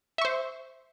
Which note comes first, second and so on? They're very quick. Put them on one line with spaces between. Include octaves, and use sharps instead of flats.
E5 C#6 C5